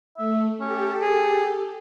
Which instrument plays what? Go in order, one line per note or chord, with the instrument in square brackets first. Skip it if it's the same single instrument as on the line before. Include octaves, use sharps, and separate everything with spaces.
[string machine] A3 [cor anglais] E5
[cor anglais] C#4 [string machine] G4 A4
[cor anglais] G#4